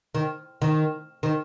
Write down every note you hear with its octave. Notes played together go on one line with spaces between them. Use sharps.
D#3
D#3
D#3